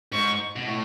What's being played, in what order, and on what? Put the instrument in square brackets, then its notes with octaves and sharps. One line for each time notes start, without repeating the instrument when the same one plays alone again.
[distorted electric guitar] G#2 [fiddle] C#6
[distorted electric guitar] B2
A2